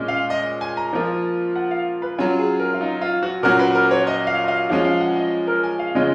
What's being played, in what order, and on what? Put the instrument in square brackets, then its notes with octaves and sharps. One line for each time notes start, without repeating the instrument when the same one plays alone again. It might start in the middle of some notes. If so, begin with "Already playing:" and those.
Already playing: [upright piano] A#2 G#3 C#4
[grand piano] F5
D#5
G#5
A#5
[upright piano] F3 A#3 F4
[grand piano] F#5
F5
B4
[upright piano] F#3 C#4 F4
[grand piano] G#4
A#4
F4
D#4
F4
F#4
[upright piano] A#2 F#3 C#4 F#4 [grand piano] A#4
[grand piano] B4
A#4
C#5
D#5
F5
D#5
F5
[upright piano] F3 G#3 C#4 [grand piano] F5
[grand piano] F5
F#5
D#5
A#4
G#5
F5
[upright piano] C#3 G#3 C#4 F4 [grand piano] D#5